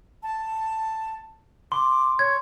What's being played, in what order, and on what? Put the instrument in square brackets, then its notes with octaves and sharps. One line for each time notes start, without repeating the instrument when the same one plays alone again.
[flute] A5
[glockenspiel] C6 [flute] D6
[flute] C#5 [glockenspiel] G#6